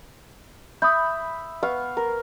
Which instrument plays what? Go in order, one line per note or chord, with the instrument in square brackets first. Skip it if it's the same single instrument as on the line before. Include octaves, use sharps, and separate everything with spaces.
[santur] E5 B5 C#6 [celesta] D#6 G6
[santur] B3 F5 C#6
A#4